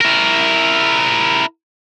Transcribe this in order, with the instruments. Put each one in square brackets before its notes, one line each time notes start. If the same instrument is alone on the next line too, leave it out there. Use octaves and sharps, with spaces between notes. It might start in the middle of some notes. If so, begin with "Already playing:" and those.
[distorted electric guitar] E4 A#4